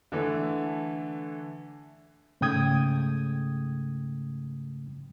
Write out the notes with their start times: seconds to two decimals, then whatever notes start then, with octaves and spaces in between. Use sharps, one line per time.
0.12 D3 E3 A3
2.41 G#2 C#3 A3 G5 D#6 G#6